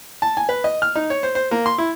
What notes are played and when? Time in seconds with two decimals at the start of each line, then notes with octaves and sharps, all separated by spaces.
0.22 A5
0.37 G#5
0.49 B4
0.64 D#5
0.82 F6
0.95 D#4
1.10 C#5
1.23 C5
1.35 C5
1.51 A#3
1.66 C6
1.78 E4